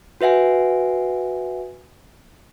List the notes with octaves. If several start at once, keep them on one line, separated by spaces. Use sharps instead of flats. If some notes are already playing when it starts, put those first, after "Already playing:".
F#4 B4 E5 F#5 G#5